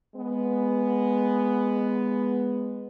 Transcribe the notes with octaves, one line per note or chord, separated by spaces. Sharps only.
G#3 B3